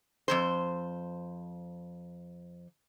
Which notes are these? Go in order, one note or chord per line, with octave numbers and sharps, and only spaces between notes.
F2 C3 C5